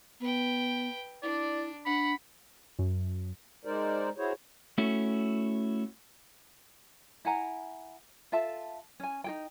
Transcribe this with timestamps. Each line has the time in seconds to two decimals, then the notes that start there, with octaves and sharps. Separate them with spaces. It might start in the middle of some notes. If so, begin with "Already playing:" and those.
0.20 B3 B4 G5
1.23 D4 E4 D5
1.86 D4 F#5 B5
2.79 F#2
3.65 G#3 D#4 A#4 C5 D5
4.17 E4 F#4 G#4 C5 C#5
4.78 A3 C#4 E4 F#4
7.25 E4 F#5 G#5 A#5
8.32 F4 A4 E5 A5
9.00 C#4 G#5
9.24 D#4 G#4 G5